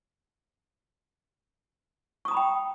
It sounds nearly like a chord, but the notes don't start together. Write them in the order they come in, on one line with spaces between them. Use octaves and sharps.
C#6 D#6 A#5 B5 G5